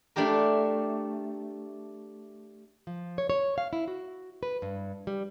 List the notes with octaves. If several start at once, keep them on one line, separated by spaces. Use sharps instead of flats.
A3 D4 E4 G4 A#4
F3
C#5
C#5
F5
E4
F#4
B4
G2
G3